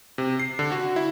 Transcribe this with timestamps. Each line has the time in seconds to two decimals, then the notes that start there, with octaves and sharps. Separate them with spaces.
0.18 C3
0.40 C7
0.59 D3
0.72 F#4
0.96 E4